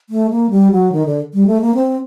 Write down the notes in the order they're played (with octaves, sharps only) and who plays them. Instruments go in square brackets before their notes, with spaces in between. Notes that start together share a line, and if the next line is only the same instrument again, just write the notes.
[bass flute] A3
A#3
G3
F#3
D#3
D3
G3
A3
A#3
C4